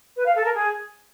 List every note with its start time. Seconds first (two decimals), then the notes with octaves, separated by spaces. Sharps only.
0.16 B4
0.26 F5
0.35 A4
0.45 A#4
0.54 G#4